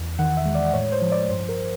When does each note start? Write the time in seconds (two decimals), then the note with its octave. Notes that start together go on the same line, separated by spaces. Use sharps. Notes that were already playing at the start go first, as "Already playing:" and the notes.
Already playing: E2 E3
0.19 D#3 F#5
0.37 E5
0.46 G#3
0.55 D5
0.74 A2 C#5
0.92 C5
1.01 F3
1.12 D5
1.30 G2 C5
1.49 A#4